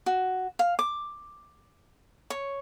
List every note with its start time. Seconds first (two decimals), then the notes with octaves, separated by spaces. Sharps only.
0.06 F#4
0.59 F5
0.79 D6
2.30 C#5